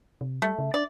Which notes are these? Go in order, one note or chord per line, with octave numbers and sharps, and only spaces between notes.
C3
G3 A3
C#3
D4 D5